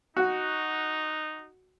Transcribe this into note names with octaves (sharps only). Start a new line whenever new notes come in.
D#4 F#4